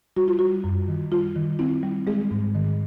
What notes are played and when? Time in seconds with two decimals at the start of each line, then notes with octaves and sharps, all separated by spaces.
0.16 G3 F#4
0.28 F4
0.39 G3 F#4
0.64 F#2
0.88 D#3
1.12 G3 F4
1.36 D#3
1.59 C4 E4
1.83 G3
2.07 G#3 G#4
2.31 G#2
2.55 D#3